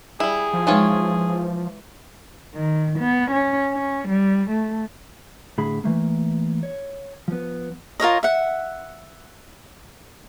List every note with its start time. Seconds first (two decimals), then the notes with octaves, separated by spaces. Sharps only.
0.20 G3 E4 G#4
0.53 F3
0.67 E3 G#3 D#4 F4 C#5
2.55 D#3
3.00 B3
3.33 C#4
3.74 C#4
4.09 G3
4.52 A3
5.58 A2 D3 G#4 B5
5.84 E3 A3 A#3
6.63 C#5
7.28 F3 B3
8.00 F4 A#4 C#5 D#5
8.23 E5 F#5